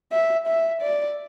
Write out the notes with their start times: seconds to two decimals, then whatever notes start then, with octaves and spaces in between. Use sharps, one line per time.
0.12 E5
0.47 E5
0.82 D5